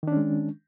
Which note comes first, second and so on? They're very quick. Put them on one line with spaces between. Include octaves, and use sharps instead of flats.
D#3 D4 C#4 G#3